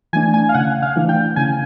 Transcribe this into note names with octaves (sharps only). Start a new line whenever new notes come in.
E3 A3 D4 G#5
G#5
F5
C#3 F#5
F5
E3 A3 D4
G5
C#3 G#5